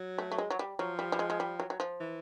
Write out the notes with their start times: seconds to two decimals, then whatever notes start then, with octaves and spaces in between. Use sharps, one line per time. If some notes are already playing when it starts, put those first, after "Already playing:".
Already playing: F#3
0.18 A3
0.32 A3
0.38 G#3
0.50 F#3
0.59 G3
0.79 F3 F#3
0.99 G3
1.12 G3
1.19 G#3
1.30 G#3
1.40 G3
1.60 F#3
1.70 F#3
1.80 F3
2.00 E3